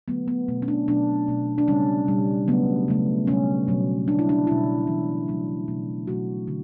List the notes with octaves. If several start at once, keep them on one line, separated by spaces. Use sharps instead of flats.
D3 F#3 A3 B3
B3
B2 A3
C#4
D4
B2 F#3 A3 D4
B2 A3
D4
C#3 G3 C#4
B2 G3
C#3 F#3 A3 B3
C#3 F#3 A3
B2 G3 C#4
B2 F#3 A3
D3 A3 D4
E4
D4
B2 G3 E4
C#3 E3 G3
C#3 F#3 A3
B2 A3
B2 F#3 A3 F#4
D3